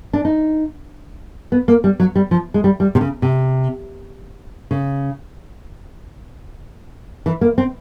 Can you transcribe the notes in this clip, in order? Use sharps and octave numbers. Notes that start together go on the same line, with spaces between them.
D4
D#4
B3
A#3
G3
F#3
G3
F3
G#3
G3
G3
C3
C#3
C3
C#3
E3
A#3
C4